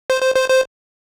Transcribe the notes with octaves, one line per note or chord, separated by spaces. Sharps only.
C5
C5
C5
C5